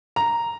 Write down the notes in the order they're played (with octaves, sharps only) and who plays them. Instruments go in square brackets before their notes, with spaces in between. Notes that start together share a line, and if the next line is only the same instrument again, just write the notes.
[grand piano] A#5